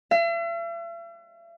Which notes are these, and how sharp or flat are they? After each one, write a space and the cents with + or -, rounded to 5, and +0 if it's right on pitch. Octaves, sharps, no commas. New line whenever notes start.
E5 +45